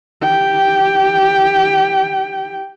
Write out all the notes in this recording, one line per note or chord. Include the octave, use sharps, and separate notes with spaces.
G4 G5